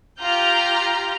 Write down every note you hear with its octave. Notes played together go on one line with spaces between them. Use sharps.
F4 G4 A#5 F6 G6